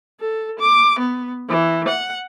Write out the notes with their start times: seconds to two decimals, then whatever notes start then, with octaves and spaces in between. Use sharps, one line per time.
0.20 A4
0.59 D6
0.99 B3
1.49 E3
1.88 F#5